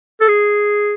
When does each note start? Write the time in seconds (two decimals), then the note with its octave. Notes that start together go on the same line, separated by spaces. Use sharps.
0.21 A4
0.28 G#4